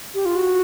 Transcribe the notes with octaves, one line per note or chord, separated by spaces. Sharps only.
G4
F4
F#4